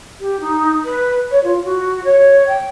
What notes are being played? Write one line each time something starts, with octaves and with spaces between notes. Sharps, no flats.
G4
D#4
B4
C#5
F4
F#4
C#5
G5